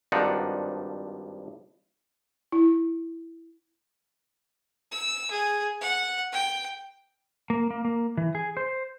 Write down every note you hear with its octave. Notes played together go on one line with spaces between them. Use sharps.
G#1 G2 F3 D4 D#4 F#5
E4
E6
G#4
F#5
G5
A#3
A#3
A#3
E3
G#4
C5